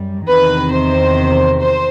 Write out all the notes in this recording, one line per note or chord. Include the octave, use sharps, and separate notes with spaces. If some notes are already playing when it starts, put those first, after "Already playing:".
Already playing: F#2 G3
E2 C3 D#3 B4
C5
C5